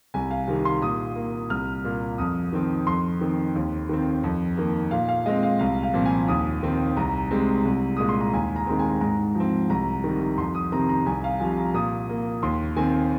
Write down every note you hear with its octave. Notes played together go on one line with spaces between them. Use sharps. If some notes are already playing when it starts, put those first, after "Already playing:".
C2 G#5
F5
C3 D#3
C6
A#2 D#6
A#3
C2 F6
A#2 A#3
F2 D#6
D#3 C4
F2 C6
D#3 C4
D#2
D#3 C4
F2
D#3 A#3
A#2 F5
F5
G#3 C4 D#5
F5
C2 F5
F5
A#2 F3 C4
G#5
D#2 D#6
D#3 C4
C2 A#5
C3 G#3 C4
C2
A#2 G#3 D#6
C6
A#5
D#2 G#5
A#5
D#3 G#3 C4
G#5
G#2 A#5
F3 C4
C2 A#5
C3 D#3
F2 C6
D#6
C3 D#3 C4 A#5
A#5
C2 G#5
F5
C3 F3 G#5
A#5
A#2 D#6
A#3
D#2 C6
D#3 C4 G#5